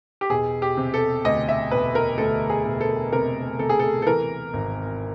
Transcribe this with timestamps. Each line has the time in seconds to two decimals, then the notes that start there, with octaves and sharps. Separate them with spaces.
0.21 G4
0.30 E1 G#4
0.62 G4
0.77 C3
0.94 A4
1.25 D2 D#5
1.49 E5
1.71 E1 B4
1.95 A#4
2.18 D2 A4
2.50 G#4
2.65 E1
2.81 A4
3.13 C3 A#4
3.59 C3 A4
3.70 G#4
3.79 A4
4.02 A4
4.06 E3 A#4
4.53 G#1